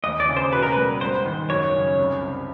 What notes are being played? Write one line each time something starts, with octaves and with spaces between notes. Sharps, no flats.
D#2 D#5
D5
C#3
C5
B2 B4
A#4
B4
G3
G#2 C5
D#3
F#2 C#5
C#3
C2
C3